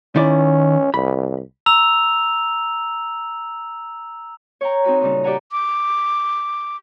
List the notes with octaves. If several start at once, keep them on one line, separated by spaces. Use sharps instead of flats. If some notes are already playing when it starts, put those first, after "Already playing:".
D#3 C#4 E4 D5
C2 B5
A#5 E6 F7
C#5 G5 A#5
C4 D#4 F#4 B4
A#2 C#3 G3 D#4
G4 D5 E5 F#5 G#5 A#5
D6